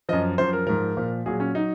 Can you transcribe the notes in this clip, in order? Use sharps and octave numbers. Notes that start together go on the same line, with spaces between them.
F#2 F3 D#5
F#2 F3 C5
A#4
G#2 F3 A#4
A#2 F3
A#2 F#3 G#4
C#4
F#3 D#4